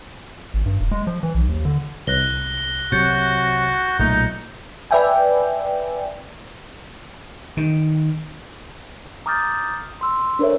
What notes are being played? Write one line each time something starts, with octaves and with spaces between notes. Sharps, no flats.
G#1
G2
E1
G#3
F3
E3
B1
D#2
D3
C2 F#6 A#6 G7
C3 F#3 F#4 G6 A6 C#7
B1 A#2 A3 D#4
B4 D5 E5 G5 G#5
D#3
A#5 D6 D#6 F6 G6 A6
C6 E6
D4 A4 A#4 C5 C#5 E5